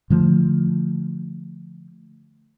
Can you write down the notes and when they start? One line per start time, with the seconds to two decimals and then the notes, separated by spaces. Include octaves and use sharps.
0.10 D3 F3 A3